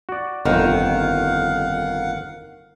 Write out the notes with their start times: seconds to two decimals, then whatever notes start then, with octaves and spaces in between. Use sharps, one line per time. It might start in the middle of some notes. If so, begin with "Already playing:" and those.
0.09 F#4 D5
0.45 G1 F2 D#3 F5 F#5